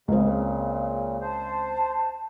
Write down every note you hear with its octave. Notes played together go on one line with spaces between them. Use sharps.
C#2 A#2 C#3 C4
C5 A5